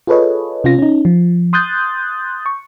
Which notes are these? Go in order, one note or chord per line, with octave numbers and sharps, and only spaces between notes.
F4 G#4 A4 B4 C#5 D#5
C3 C#4 F4 A#6
C#4 D#4
F3
C6 D#6 F#6 G6 A6
C#6